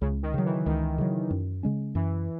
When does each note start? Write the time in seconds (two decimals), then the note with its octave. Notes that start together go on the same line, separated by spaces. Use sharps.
0.01 C#2 C#3
0.23 D#3
0.34 C#3 F#3
0.45 E3
0.65 C#2 D#3
0.98 C#3 F#3
1.31 F#2
1.63 C#3 G#3 C#4
1.95 F#2 E3